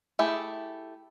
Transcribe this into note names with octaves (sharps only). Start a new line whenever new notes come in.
A3 E4 G4 G#4